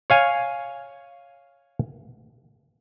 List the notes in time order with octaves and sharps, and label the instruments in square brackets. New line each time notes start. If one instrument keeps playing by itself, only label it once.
[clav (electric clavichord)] C#5 F5 G#5